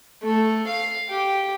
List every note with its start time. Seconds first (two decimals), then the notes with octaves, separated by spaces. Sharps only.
0.23 A3
0.67 F5
1.09 G4